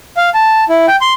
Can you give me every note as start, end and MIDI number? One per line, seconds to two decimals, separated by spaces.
0.17 0.29 77
0.34 0.65 81
0.69 0.86 64
0.88 0.96 79
1.01 1.13 84